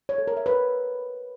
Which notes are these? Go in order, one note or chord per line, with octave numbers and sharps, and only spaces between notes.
C#5
A4
A#4
E5
B4